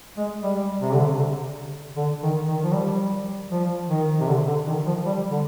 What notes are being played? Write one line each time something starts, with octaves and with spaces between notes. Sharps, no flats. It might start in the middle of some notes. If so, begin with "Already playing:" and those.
G#3
G3
C3
D3
C3
D3
D#3
D#3
F3
G3
F3
D#3
C3
D3
D3
D#3
F3
G3
D3